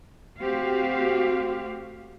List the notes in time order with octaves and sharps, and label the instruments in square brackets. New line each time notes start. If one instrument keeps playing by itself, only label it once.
[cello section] A3 C4 F#4 G4 F5